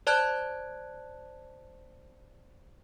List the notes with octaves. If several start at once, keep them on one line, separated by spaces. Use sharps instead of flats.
C5 D5 A5 F#6 G#6